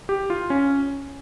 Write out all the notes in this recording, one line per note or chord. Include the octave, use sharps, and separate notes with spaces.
G4
F4
C#4